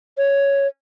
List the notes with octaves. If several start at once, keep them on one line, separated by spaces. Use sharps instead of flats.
C#5